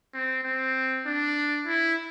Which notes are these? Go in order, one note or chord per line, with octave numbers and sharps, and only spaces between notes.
C4
C4
D4
E4